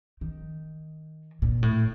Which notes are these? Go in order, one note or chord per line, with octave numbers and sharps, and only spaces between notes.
D#3
A#2
A2